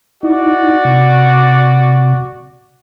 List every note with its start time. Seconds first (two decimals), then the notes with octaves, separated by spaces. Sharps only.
0.23 D#4 E4 F#4 D5
0.85 C3